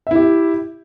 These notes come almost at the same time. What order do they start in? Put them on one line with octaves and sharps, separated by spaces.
E5 E4 G4